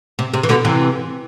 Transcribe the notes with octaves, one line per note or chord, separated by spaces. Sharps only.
C3
C3
E3
B2 D3
C3 E3